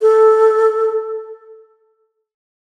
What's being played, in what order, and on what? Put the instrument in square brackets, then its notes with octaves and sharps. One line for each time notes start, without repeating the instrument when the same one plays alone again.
[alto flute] A4